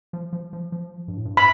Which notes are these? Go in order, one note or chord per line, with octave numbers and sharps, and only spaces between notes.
F3
F3
F3
F3
G2
A2
G2
B5